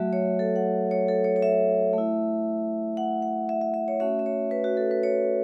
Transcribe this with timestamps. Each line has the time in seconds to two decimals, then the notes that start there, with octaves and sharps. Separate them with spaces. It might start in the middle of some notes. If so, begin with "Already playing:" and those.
Already playing: F#3 A3 F#4 E5
0.13 C#5
0.39 A4
0.56 F#5
0.91 C#5
1.08 A4
1.24 C#5
1.36 C#5
1.42 E5
1.93 A3 E4
2.97 F#5
3.22 F#5
3.49 E5
3.61 E5
3.74 E5
3.88 C#5
4.00 A3 C#4 F#4 E5
4.19 E5
4.26 C#5
4.51 B4
4.64 F#4
4.77 A4
4.91 B4
5.03 C#5